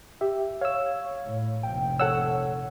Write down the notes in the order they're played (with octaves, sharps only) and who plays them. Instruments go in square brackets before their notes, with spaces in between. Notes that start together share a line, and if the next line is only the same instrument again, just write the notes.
[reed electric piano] G4 E5
[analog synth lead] C#5 [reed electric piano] F5 E6
[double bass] A2
[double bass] F1 A#1 [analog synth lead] G5
[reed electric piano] A4 F#5 E6 [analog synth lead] C#5